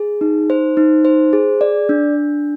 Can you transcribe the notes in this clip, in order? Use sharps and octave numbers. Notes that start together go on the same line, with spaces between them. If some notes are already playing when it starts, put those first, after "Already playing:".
Already playing: G#4
D#4
C5
D#4
C5
G#4
D5
D4